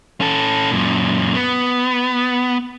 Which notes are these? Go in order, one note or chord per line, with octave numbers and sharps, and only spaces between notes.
C#4 A4
F#2 A#2
B3